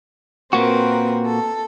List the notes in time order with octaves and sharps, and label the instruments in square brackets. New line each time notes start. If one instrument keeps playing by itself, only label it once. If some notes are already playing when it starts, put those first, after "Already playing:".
[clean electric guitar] A#2 A#3 F#4 [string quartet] C4 A#4 B4
[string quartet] A4